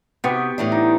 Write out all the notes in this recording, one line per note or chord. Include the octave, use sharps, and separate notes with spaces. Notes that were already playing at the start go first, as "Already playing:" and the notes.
C3 B3 G4 C#6
A2 E3 D4
D#4